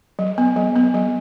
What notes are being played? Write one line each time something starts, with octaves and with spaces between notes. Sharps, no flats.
F#3
B3
F#3
B3
F#3